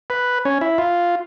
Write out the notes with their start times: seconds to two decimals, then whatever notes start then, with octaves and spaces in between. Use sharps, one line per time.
0.10 B4
0.45 C#4
0.61 E4
0.78 F4